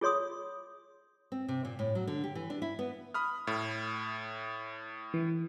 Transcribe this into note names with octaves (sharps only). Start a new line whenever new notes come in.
F4 G#4 C#5 C6 D#6
C4
C3
A#2
A2
F#3
D3
G4
E3
D4
E4
B3
B5 D#6 F6
A2
E3